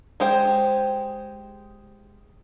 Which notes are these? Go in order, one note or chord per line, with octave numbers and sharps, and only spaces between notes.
G#3 G4 C5 G5